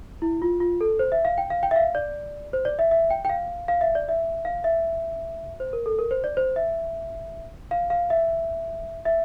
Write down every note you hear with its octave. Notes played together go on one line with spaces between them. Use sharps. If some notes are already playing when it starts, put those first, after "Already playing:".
E4
F4
F4
A4
C5
E5
F5
G5
F5
G5
E5
F5
D5
C5
D5
E5
E5
G5
G5
F5
F5
E5
D5
E5
F5
E5
C5
A#4
A4
A#4
C5
D5
C5
E5
F5
F5
E5
E5